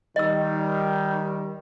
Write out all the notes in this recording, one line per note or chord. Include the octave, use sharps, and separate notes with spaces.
D#3 G3 D#5 E6